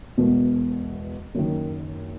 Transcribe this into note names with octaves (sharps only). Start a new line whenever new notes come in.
E1 E2 B2
F#1 F#2 D#3